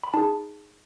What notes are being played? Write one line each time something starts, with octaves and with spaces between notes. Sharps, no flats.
B5
D#4 G#4 A5